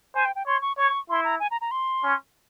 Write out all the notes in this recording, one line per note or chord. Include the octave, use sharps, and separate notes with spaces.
C5 G#5
G5
G5
C#5 C6
C#6
C#5 C#6
E4 C6
A#5
G#5
A#5
A#5
C6
C#4